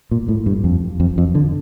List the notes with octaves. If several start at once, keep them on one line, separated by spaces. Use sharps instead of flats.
A#2
A2
G2
F2
F2
F2
D3